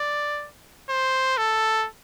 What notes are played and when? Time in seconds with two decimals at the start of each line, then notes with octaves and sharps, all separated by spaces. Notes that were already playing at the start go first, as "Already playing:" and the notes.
Already playing: D5
0.89 C5
1.38 A4